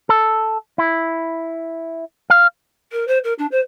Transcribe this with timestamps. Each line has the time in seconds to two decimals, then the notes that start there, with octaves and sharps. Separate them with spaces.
0.09 A4
0.78 E4
2.30 F5
2.92 A#4
3.08 C5
3.24 A#4
3.39 D4
3.52 C5